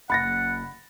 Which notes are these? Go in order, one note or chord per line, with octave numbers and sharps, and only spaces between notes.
F#1 F#5 B5 A6 A#6